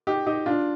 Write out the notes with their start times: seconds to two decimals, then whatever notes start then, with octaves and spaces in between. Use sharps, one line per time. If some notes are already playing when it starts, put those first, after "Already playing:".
0.07 D#4 G4
0.26 D#4 G4
0.46 D4 F4